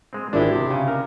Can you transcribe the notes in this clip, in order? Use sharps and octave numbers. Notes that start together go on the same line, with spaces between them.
G#3 C4
G#1 G#3 D4 E4 G4
C3
C#3
A#4